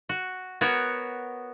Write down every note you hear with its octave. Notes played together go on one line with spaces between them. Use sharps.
F#4
B3 F#4 A#4 C#5